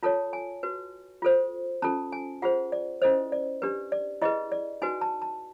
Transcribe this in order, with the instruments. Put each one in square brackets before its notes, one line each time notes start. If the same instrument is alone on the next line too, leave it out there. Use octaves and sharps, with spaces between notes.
[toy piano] F4 A4 C#5 A5
G#5
F#4 B4
F4 A4 C5
C#4 F4 A4 A5
G#5
F4 G#4 C5 F#5
D5
C#4 E4 A4 C5 D#5
D5
D4 G4 B4
D5
E4 G#4 B4 D#5
D5
D#4 F#4 B4 G#5
A5
A5